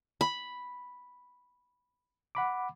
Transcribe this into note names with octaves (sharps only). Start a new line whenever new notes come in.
B5
F#5 B5 D6